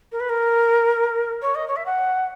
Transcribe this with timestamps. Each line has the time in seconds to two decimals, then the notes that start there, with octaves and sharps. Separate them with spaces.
0.12 A#4
0.20 B4
0.29 A#4
1.42 C#5
1.55 D#5
1.68 C#5
1.76 E5
1.86 F#5